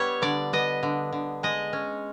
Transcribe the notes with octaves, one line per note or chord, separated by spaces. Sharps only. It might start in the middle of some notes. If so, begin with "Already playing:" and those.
Already playing: G3 B3 C#5
D3 D5
B3 D#5
D3
D3
G#3 D#5
C#4